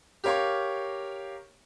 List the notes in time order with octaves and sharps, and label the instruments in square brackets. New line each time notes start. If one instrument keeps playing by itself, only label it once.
[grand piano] G4 A#4 C#5 F5 C#6